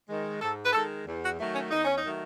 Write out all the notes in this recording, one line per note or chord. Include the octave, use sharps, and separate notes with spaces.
D#3 G#3
G#2 A4
B4
D#3 G#3 A4
E2
F#4
D#3 F#3 A3
C#4
E2 D#4
C#4
D#4
D#3 F#3 A3